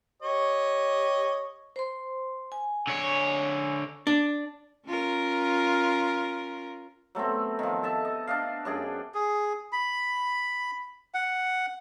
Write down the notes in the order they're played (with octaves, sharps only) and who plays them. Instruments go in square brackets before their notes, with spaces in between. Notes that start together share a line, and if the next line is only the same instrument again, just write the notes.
[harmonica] G4 C#5 D#5
[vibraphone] C5 C6
G#5
[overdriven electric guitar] D3 C#5
[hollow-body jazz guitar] D4
[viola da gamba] C#4 F4 A#4
[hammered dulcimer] F#3 A3 B3 C4
D#3 F3
A4 E5 A5
D#5
D4 D#5 F5
F#2 D4 G#4 G5
[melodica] G#4
B5
F#5